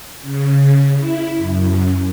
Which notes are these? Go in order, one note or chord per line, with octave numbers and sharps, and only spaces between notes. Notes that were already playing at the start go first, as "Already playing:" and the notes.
C#3
E4
F#2